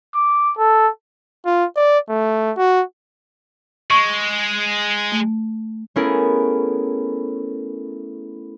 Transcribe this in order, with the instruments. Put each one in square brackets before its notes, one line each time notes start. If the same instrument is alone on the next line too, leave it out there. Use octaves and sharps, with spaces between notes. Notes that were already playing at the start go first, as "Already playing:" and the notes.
[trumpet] D6
A4
[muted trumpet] F4
D5
A3
F#4
[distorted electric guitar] G#3 [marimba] C#6
[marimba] A3
[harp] A3 B3 C#4 E4 G#4 A#4